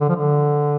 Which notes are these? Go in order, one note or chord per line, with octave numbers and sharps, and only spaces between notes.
D3
F3
D3